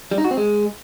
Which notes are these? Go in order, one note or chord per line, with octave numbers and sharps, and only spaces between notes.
G3
D#4
F#4
C4
G#3